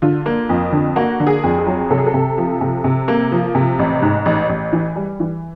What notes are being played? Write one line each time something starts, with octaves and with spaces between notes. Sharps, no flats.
D3 F4
A#3
F2
D3
A#3 F#4
D3
G#4
F2
G#4
F#3
C3 A4
G#4
A4
C3
F3
C3
C3
A#3
F3
C3
A1
G#2
A1
A1
E3
G3
E3